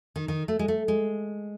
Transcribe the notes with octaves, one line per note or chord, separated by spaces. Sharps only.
D#3
D#3
A3
G#3
A3
G#3